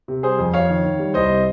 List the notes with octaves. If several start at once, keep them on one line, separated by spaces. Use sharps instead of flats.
C3
G3 G#4 C5
F2
F2 C#5 F5
D#3
D#3
G3
C2 C5 D#5
C3